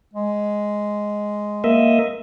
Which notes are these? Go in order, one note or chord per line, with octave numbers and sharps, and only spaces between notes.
G#3
A#3 D#5 E5